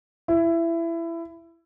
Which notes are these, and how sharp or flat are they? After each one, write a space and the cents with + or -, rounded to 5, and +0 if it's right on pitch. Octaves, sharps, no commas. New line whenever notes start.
E4 +20